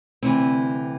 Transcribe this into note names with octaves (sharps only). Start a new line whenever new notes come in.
D2 C3 E3 C4